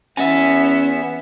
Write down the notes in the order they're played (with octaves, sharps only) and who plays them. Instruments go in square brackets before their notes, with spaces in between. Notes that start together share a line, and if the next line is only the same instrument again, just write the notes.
[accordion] E2 B3 [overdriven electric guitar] C#4 [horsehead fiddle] E5 [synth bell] G#5